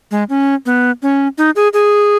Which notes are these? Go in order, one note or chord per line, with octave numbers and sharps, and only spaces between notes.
G#3
C#4
B3
C#4
D#4
G#4
G#4